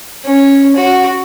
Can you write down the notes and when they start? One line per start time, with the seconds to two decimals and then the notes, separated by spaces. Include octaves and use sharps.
0.24 C#4
0.76 F#4